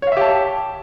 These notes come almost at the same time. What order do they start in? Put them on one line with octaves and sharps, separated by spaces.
C#5 F5 E5 G4 A5